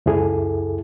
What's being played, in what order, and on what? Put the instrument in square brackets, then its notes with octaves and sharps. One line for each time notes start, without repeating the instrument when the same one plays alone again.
[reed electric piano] C#2 F#2 E4 G#4 A4